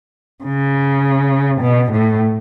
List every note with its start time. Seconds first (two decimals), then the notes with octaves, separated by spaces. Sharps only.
0.45 C#3
1.61 B2
1.91 A2